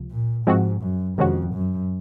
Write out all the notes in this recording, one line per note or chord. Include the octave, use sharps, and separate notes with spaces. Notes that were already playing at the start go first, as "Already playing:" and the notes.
Already playing: C#2 C3 F3
A#2
G#2 F3 G#3 C4 F#4
F#2
F2 C3 D#3 G#3 C#4 F#4
F#2